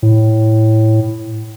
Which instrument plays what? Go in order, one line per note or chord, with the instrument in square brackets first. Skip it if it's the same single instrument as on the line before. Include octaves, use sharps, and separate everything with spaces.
[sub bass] A2